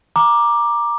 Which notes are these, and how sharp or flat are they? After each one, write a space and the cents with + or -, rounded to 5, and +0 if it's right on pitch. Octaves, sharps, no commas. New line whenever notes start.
A#5 +15 D6 +10